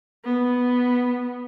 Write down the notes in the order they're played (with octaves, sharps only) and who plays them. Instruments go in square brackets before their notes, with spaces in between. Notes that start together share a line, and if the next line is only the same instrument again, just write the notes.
[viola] B3